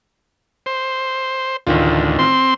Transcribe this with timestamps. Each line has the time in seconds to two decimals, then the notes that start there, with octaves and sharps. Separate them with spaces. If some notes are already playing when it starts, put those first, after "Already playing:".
0.66 C5
1.67 A1 D2 D#3 F4
2.19 C4 C6